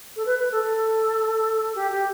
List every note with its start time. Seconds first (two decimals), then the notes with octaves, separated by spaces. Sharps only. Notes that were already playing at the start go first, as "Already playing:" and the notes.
0.16 A4
0.26 B4
0.39 B4
0.52 A4
0.63 A4
1.75 G4
1.91 G4